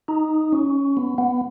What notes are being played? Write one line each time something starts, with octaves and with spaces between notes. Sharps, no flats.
D#4
C#4
B3
B3